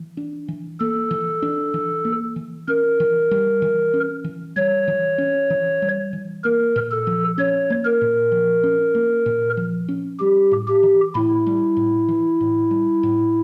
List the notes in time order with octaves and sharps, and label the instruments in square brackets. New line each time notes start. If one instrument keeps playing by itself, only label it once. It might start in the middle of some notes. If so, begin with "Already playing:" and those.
Already playing: [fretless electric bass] E3
D4
E3
[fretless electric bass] A#3 [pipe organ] A4
[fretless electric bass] E3
D4
E3
A#3
E3
[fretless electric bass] C#4 [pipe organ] A#4
[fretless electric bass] E3
G3
E3
C#4
E3
[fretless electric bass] G3 [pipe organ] C#5
[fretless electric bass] E3
C#4
E3
G3
E3
[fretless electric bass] A#3 [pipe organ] A#4
[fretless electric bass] A#2
[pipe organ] A4
[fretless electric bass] F3
[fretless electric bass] C#4 [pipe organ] C#5
[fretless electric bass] A#3
[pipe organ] A#4
[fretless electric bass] A#2
F3
C#4
A#3
A#2
F3
C#4
[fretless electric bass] G3 [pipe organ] G4
[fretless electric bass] A2
[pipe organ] G4
[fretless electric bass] E3
[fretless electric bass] A2 [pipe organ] E4
[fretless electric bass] G3
A2
E3
A2
G3
A2